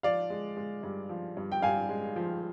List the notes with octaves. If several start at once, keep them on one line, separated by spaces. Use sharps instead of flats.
F3 D5 F5
G#3
G#3
G2
F3
G2
G5
G2 F5 G#5
G#3
F3